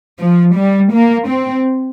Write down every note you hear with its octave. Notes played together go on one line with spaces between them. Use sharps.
F3
G3
A#3
C4